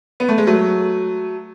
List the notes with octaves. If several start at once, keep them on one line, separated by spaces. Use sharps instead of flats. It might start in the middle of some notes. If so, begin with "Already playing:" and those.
B3
A3
G#3
F#3 A3